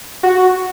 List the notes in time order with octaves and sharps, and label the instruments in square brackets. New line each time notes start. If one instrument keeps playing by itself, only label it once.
[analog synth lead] F#4